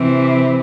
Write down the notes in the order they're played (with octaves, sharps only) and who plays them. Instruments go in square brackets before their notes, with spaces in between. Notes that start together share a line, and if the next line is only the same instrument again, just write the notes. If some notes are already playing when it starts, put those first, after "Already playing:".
Already playing: [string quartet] C3 E3 C4